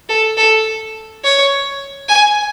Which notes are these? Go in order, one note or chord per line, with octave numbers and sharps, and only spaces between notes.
A4
A4
C#5
G#5